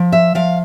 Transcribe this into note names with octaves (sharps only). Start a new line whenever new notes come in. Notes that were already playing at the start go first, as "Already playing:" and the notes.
Already playing: F3
E5
F3 F5